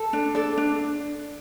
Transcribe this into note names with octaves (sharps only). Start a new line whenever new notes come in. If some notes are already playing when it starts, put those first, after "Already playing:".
Already playing: A4
D4
A4 D5
D4